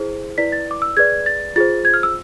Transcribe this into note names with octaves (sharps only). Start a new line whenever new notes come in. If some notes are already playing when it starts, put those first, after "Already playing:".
Already playing: E4 G#4 C5
E4 B4 D5 B6
A6
D6
E6
G#4 B4 D5 G#6
A6
F4 G#4 C5 A6
G#6
F6
E6